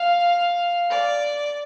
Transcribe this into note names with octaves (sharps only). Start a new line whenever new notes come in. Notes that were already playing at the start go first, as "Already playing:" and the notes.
Already playing: F5
D5